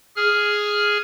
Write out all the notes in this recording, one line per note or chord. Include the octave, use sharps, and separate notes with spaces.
G#4 F6